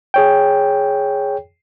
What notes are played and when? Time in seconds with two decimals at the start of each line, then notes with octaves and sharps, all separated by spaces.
0.14 G#4 C#5 G5